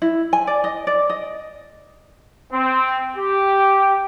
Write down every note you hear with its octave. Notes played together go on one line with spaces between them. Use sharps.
E4
G#5
D5
D#5
D5
D#5
C4
G4